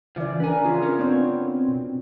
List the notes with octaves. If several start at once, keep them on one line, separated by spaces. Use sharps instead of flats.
C#3 E3 F3 D5
C#4 D4 A#4 B4 G#5
C#4 F4 G#4
C#4 A#4
B3 C4 D4 C#5
B2